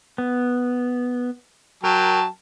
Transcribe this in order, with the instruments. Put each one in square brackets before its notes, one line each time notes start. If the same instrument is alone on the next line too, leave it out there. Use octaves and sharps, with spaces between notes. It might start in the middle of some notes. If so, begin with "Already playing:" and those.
[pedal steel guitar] B3
[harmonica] F#3 G5 A5 [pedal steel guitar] A#4